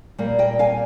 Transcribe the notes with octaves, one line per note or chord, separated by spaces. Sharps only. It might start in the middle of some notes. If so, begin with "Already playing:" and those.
A#2 G3 A#3
D#5 G5
F5 G#5